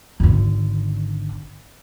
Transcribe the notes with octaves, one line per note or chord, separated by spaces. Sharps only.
G#1 D3